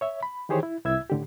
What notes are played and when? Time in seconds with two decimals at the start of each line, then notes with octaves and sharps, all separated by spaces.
0.01 C#5 E5
0.23 B5
0.49 D#3 E3 G4 G#4 C5 C#5
0.63 E4
0.85 C2 E4 E5 E6 G#6
1.10 A2 D3 G4